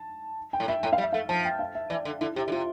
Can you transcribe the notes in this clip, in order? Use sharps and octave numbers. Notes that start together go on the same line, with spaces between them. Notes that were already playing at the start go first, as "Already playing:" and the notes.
Already playing: A5
G5
A2
A#2 E5
A2 G5
F5
G3
E5
A3 F5
F3 A5
G5
F5
E5
E3 D5
D3
D3 E4
C3 G4
D3
C3 F4